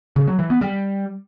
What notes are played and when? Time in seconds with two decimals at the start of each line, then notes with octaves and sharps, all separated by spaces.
0.16 C#3
0.27 F#3
0.39 E3
0.50 B3
0.61 G3